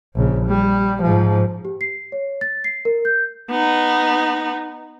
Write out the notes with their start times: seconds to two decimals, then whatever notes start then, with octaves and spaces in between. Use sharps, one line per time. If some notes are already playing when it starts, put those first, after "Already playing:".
0.15 A#1 C#3
0.47 G3
1.02 G#2 F3
1.65 G4
1.81 C7
2.12 C#5
2.41 A6
2.64 C7
2.85 A#4
3.05 G6
3.51 B3 D#4